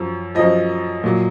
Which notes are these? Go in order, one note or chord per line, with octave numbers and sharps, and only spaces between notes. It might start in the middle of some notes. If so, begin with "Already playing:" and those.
Already playing: F#2 F3
F#2 F3 D#5
A#2 F#3